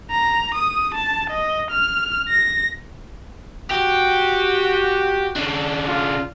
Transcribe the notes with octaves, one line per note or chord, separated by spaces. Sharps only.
A#5
D#6
A5
D#5
F6
A#6
F#4 G4
C#3 D4
F4